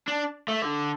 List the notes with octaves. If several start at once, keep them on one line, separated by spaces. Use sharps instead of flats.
D4
A3
D3